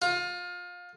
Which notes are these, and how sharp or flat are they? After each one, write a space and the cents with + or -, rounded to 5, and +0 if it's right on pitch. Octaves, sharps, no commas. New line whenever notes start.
F4 +25